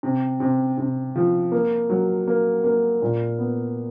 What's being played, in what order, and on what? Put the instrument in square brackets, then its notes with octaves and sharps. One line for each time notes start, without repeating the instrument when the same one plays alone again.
[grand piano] C3
C3
C3
F3
A#3
F#3
A#3
A#3
A#2
B3